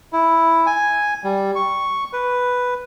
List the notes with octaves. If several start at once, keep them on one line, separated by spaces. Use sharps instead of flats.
E4
G#5
G3
C#6
B4